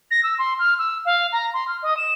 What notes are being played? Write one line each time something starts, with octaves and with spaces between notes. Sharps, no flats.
A#6
E6
C6
F6
E6
F5
A#5
C6
F6
D#5
E7